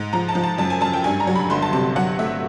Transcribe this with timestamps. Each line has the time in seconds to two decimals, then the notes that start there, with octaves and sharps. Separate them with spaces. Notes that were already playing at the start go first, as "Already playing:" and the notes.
Already playing: G#2
0.13 F3 A#5
0.29 A5
0.35 F3
0.44 A5
0.58 F#2 A5
0.70 G#5
0.81 F#2 A5
0.94 G5
1.04 G2 G#5
1.20 A#5
1.27 F#3
1.36 B5
1.50 G1 C6
1.62 A5
1.73 C3 A5
1.96 F#3 F#5
2.19 A3 E5